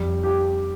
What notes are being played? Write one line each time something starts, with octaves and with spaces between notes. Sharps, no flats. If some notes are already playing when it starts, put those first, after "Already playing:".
Already playing: F2 G3
G4